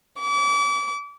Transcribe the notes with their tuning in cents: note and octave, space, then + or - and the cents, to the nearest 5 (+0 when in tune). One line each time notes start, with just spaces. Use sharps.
D6 -35